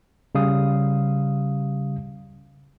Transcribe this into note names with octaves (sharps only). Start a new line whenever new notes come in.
C#3 G3 F5 D#6